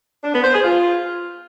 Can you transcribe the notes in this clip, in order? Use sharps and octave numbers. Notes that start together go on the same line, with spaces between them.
D4
B3
C5
G#4
F4